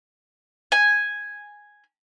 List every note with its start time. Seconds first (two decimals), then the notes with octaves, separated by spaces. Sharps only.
0.72 G#5